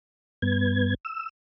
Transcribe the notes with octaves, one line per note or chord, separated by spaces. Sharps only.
G2 B3 G#6
E6